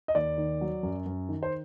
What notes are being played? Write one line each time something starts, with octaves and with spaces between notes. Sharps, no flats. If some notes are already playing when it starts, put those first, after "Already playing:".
D#5
D#2 D5
D#3
F#3
F#2
F#2
D#3
C5